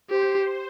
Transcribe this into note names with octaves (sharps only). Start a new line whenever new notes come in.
G4 C5